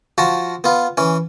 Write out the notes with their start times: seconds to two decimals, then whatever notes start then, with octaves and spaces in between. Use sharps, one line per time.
0.18 F3 F#4 A5
0.64 B3 F4
0.97 E3 C#4